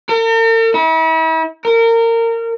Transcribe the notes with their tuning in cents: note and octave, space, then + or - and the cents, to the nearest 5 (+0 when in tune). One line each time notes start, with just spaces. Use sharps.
A#4 -45
E4 -40
A#4 -25